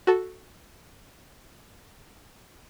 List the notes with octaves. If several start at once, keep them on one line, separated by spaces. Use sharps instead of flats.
F#4 A4